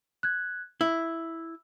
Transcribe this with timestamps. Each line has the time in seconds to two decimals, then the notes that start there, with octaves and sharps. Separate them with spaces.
0.23 F#6 G#6
0.81 E4 E6